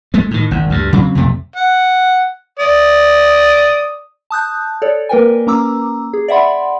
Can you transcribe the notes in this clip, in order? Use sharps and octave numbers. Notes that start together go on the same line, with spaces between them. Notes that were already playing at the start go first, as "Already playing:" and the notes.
G#3 A3
A2 D#3
G#1 G#2
D2 G2
C#3 F#3 G3 C4
B1 F2 C3 A3
F#5
D5 D#6
A5 D#6 F#6 G6
A4 C#5 D5
A#3 A#4 B4 G5 G#5
A#3 C#4 A#5 D6 E6
G#4
D5 E5 F#5 B5 C6